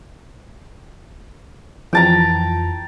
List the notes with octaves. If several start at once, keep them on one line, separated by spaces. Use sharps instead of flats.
F2 E3 F3 G5 A5 A#5